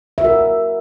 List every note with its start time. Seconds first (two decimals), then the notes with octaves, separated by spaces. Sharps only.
0.18 E5
0.21 F#4
0.25 A#4